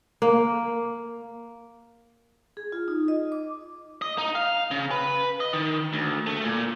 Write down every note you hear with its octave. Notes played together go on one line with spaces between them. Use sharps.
A#3
G#4
F4
D#4
D#5
D6
D#5
D#4
F5
C#3
B4
D#5
D#3
D2
A3
A#2